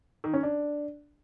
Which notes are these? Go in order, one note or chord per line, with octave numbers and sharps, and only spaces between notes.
D#3
C#4
D4